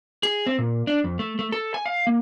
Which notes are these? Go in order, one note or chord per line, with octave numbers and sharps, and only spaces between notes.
G#4
C4
A#2
D4
F2
A3
A3
A4
G#5
F5
A#3